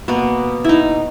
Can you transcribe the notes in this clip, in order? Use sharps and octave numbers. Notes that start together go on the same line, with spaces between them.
B2 A#3 B3
D#4 E4